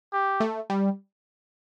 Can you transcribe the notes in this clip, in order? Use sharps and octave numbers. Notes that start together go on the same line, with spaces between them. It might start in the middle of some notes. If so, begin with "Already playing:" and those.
G4
A3
G3